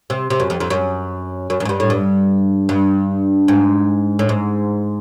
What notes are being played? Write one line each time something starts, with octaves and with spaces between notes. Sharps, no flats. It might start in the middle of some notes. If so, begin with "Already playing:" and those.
C3
C3
F#2
F2
F2
F#2
F#2
F#2
G#2
G2
A2
G2
G2
G#2
A2
G#2